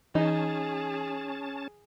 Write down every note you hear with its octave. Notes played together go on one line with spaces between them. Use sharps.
E3 C#4 D#4 G#4 A5